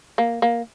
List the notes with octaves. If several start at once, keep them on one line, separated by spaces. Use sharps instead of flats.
A#3
A#3